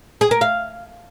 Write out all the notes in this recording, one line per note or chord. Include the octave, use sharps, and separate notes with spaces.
G#4
A#4
F5